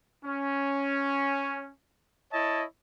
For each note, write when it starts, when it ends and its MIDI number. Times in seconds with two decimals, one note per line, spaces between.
0.25 1.72 61
2.32 2.64 64
2.32 2.64 73
2.32 2.64 75
2.32 2.64 81